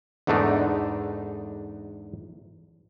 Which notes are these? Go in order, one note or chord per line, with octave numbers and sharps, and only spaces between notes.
E2 G#2 D3 A3 D4 D#4